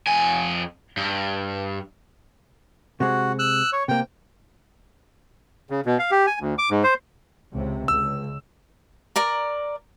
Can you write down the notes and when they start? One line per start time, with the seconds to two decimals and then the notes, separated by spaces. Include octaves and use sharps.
0.07 F2 G#5
0.97 G2
3.00 C3 G#3 F#4
3.39 E6 F#6
3.73 C#5
3.88 C3 A#3 G5
5.70 C#3
5.86 B2
5.99 F5
6.11 G4
6.27 G#5
6.40 D2
6.58 D6
6.71 G#2
6.83 C5
7.54 C#2 C3
7.88 C#2 E6
9.16 A#4 D5 A#5